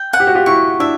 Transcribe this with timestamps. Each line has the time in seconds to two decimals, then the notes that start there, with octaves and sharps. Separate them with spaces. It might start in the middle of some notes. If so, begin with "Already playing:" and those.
Already playing: G5
0.13 F#5
0.20 G4
0.27 F#4
0.35 F4 G4
0.46 E4 F#4 C#6
0.80 D4 E4 E5